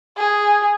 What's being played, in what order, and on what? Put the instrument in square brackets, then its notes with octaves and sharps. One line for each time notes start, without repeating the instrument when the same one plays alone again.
[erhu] G#4